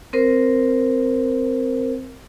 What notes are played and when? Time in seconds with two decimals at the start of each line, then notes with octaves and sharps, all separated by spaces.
0.13 C4 A#4 C5